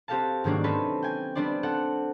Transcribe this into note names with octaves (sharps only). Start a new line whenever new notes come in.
C4 F#4 G4 A4 F5 A5
G#2 D#3 F#3 A#3 C#4 D4
C4 C#4 D#4 A4 B4
G5 G#5
G3 B3 D4 C5 D5
C4 A4 F#5